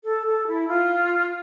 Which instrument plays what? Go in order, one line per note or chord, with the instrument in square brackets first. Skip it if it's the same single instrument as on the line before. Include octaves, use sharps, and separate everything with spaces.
[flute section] A4
A4
E4
F4